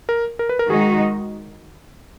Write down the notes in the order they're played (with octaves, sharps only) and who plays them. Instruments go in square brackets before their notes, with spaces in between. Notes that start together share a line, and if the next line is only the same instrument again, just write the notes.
[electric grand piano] A#4
A#4
B4
A#4
[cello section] D#3 G#3 D#4 F#4 [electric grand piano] G#4